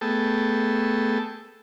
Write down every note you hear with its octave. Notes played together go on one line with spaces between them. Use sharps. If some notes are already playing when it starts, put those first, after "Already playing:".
A3 B3 G#4 A4 G5 A5